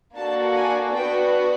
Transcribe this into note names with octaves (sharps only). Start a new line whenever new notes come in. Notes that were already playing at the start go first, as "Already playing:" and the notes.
A#3 D4 F#4 A4 A5
G#5
B3 D4 F#4 G5